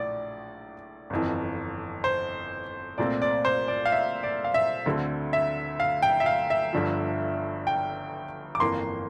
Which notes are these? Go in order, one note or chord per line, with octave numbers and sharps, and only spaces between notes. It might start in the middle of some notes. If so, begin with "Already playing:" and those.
Already playing: A#1 A2 D5
G1 F2 E3
C5
C2 A#2 A3 C4 D5
D5
C5
D5
F5
E5
D5
F5
E5
D2 D3 A3 C4
E5
F5
G5
E5
F5
E5
G1 G2 D3 F3
G5
D6
G1 F2 E3 A#3 C6